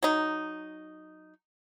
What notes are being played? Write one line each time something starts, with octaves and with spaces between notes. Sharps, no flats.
F#3 D#4